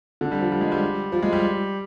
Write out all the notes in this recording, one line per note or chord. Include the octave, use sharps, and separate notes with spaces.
D3
G3
F3
G3
G#3
G3
F3
G#3
G3